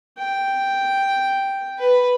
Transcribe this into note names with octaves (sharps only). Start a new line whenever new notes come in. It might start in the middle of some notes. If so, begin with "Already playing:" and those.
G5
B4